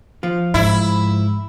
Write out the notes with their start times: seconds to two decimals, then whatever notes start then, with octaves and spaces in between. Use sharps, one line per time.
0.23 F3 F4
0.54 G#2 E4